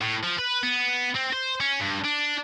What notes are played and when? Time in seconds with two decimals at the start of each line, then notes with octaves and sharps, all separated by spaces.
0.01 A2
0.23 F3
0.39 B4
0.63 B3
1.15 C4
1.33 C5
1.60 C#4
1.80 G2
2.04 D4